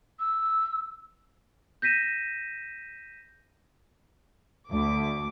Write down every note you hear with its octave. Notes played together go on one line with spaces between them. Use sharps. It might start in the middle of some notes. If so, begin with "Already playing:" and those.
E6
G6 A#6 B6 D#7 E7
D2 D6